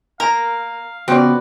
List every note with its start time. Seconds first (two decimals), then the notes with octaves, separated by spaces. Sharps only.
0.20 A#3 A#4 F5
1.08 C#3 B3 C4 F#4 B4 D5